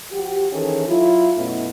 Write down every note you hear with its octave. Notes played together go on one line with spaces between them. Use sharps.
F3 F#4 G4
D#3 E3 C#4 G#4 A4
F#3 E4 F4
F#2 B2 A3 C#4 E4